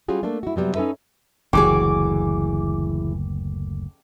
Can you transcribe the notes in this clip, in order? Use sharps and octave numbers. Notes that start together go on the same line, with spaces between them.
G3 C#4 F4 F#4 G#4
A3 A#3 D4
E4 F#4
C3 F#3 G3 B3
C#4 D#4 A4 B4 E5
F#1 D2 E3 F#4 G#4 D6